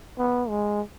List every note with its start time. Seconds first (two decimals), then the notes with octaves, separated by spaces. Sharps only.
0.18 B3
0.49 G#3